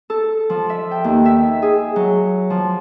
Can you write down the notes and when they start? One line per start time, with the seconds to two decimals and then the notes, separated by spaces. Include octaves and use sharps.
0.10 A4
0.50 F3
0.69 E5
0.91 G5
1.04 D#2
1.25 E5
1.62 G#4
1.96 F#3
2.50 F3